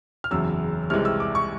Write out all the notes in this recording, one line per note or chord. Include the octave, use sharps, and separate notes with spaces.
F6
F#1 E2 C#3 F#3 E6
C2 C3 E3 G#3 F6
E6
D6
C#6